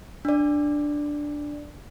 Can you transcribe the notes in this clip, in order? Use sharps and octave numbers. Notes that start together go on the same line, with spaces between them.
D4 D5